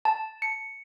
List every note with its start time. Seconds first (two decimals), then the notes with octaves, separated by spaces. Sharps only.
0.05 A5
0.42 C#7